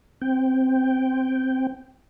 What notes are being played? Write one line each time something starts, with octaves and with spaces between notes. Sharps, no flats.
C4 G5